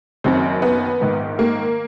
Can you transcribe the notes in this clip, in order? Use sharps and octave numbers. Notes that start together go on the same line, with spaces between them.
F#1 F#2 D#3 C4
B3
A#1 G#2 D#3
A#3